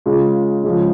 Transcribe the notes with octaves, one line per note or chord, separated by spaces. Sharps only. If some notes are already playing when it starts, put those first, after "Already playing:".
C#3 G#3 F4
C#3 F3 G#3